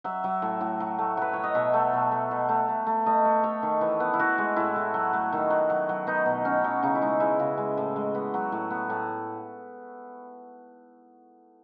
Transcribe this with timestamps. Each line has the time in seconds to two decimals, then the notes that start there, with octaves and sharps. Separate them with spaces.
0.04 F#3 E5
0.24 F#3
0.42 A2
0.61 A2
0.80 F#3
0.99 A3
1.17 F#3 B4
1.33 F#3 C#5
1.43 D#5
1.55 B2 E5
1.74 A3
1.93 B2
2.12 A3
2.31 B2
2.49 A3
2.68 A3
2.87 A3
3.06 A3 D#5
3.25 A3
3.43 A3 C#5
3.63 D#3
3.81 E3
4.00 B3
4.13 E4
4.19 E3 F#4
4.38 G#3
4.56 A2 E4
4.76 A3
4.94 F#3
5.13 A3
5.32 D#3
5.50 F#3
5.70 F#3
5.89 F#3
6.07 B3 D#4
6.26 B2
6.45 B2 C#4
6.64 F#3
6.83 C#3 D#4
6.95 E4
7.01 G#3 D#4
7.20 G#3 E4
7.39 C#3 F#4
7.58 G#3
7.77 A2
7.96 G#3
8.15 B3
8.34 F#3
8.52 A2
8.71 B3
8.90 A2